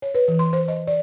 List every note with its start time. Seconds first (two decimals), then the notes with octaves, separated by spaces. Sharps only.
0.02 C#5
0.15 B4
0.28 E3
0.39 C6
0.53 C5
0.68 D#5
0.87 D5